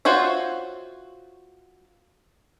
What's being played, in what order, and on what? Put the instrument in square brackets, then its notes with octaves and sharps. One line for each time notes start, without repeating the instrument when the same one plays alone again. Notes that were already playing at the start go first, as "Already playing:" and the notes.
[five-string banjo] F4 F#4 C5 C#5 E5